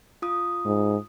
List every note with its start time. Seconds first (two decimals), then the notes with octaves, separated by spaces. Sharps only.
0.22 F4 D#6
0.65 G#2